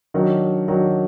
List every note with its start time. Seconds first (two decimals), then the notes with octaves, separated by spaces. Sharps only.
0.14 D#3 F#3 D4
0.68 D#3 F#3 D4